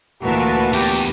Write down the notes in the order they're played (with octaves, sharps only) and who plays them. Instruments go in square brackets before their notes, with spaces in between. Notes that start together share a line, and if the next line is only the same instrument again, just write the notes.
[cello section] D2 A#2 E3 [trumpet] F#4 [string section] A#4 B4 A5
[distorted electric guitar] E2 [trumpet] G4